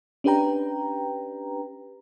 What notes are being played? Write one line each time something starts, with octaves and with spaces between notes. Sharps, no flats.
C#4 D4 G4 B4 G5 A#5